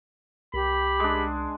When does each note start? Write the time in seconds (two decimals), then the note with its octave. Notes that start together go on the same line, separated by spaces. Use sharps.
0.54 C2 G4 B5
1.00 G#3 D4